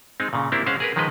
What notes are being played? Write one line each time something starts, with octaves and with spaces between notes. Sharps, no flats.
G#3 C4 D#4
A#2 C#3
A#3 C4 D4 E4 G4
G#3 C#4 C5 F5 F#5
G#4 A#4 B4
D#3 F3 G#3 B4 D#5